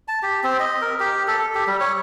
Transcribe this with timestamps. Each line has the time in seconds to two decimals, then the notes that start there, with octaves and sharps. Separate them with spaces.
0.08 A5
0.23 G4
0.43 C4
0.59 D#5
0.82 A#4
1.00 G4
1.28 A4
1.55 G4
1.67 G3
1.80 C#5